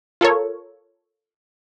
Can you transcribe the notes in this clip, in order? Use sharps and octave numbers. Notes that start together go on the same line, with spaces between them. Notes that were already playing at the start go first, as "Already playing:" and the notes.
F4 A4 A#4 C#5